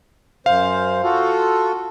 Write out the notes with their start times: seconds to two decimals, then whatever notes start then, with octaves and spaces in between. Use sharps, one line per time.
0.46 F#2 C5 F5
1.03 F4 F#4 A4